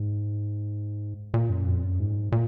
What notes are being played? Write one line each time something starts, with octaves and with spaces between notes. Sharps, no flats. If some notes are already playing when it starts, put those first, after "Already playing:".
Already playing: G#2
A#2
F#2
F2
F#2
G#2
A#2